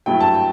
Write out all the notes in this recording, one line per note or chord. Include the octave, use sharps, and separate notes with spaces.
G2 F#3 A3 E4 G5
A5
G5